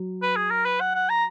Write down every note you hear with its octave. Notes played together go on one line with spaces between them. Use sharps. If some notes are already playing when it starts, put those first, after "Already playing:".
Already playing: F#3
B4
G#4
A#4
B4
F#5
F#5
A#5